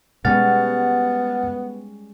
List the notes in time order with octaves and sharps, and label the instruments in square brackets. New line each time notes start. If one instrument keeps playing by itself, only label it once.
[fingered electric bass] B2 [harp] G3 G#3 C#4 [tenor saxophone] B3 [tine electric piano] F#5 F6 A6